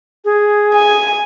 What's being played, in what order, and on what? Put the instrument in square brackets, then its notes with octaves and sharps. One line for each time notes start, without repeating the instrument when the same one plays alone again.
[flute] G#4
[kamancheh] G#5